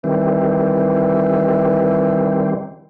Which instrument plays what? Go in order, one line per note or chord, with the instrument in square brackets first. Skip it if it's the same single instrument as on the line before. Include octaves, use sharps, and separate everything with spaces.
[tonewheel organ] D#3 G3 C4 [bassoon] E3